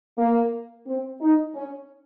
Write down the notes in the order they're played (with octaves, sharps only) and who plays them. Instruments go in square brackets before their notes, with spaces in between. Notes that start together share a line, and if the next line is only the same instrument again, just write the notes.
[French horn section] A#3
C4
D#4
C#4